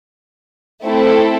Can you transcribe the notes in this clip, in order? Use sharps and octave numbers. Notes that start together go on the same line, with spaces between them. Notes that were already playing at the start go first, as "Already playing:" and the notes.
A3 C4 E4 A4